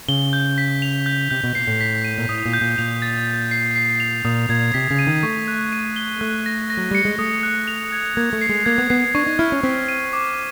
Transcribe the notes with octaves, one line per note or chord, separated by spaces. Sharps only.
C#3 G7
G6
B6
F7
G6
C3 G6
B2
A#2 C7
A2
B6
D#7
A#2
A2 D#6
A#2
G6
A#2
A#2 F7
A6
A6
C7
C7
F7
A#2 D#6
A#2 G#6
C3 B6
C#3
D#7
D#3
A3 C#6
F#6
D#7
G7
A3 F#6
A#6
A#6
F#3
G3 C#7
G#3
A3 D#6
F#6
F7
G#6
A#3 G#6
A3
C7
G#3
A#3 G#6
B3
B3 C7
D4 C#6
D#4
E4 F6
C#4
C4 B6
D#7
D6